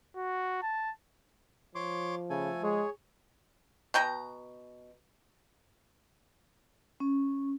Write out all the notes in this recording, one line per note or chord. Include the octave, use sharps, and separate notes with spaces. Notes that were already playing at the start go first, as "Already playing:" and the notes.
F#4
A5
F3 C#5 C6 D6
C#3 A3 A4 G#5
G#3 G#4 C#5
B2 G5 A#5
C#4